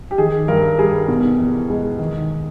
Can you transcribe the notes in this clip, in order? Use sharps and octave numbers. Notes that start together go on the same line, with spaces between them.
G4
D#3 G#4
G2 A#4
G3 G#4
B2
E2
G#3
D#3